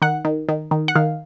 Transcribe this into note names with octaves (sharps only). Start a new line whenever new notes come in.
D#3 F#5
D#3
D#3
D#3
F#5
D#3 F5